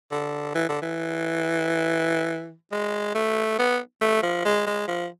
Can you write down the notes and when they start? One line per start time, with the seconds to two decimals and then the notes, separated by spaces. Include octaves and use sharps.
0.12 D3
0.55 E3
0.69 D3
0.82 E3
2.72 G#3
3.15 A3
3.59 B3
4.02 A3
4.23 F3
4.45 G#3
4.66 G#3
4.88 F3